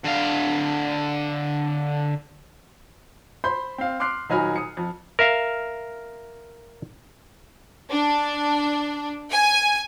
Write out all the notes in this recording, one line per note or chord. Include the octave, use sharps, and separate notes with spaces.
D3 F5
C5 B5 C6 G6
C4 F5
C6 D6 F6 F#6 C7
D#1 F#3 D#4 G#5 B5 F6
D#6 C#7
F2
A#4 E5 F5
D4
G#5